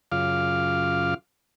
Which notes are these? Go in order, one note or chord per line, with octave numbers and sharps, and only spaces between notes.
F#2 C#3 F4 F5 D6 F6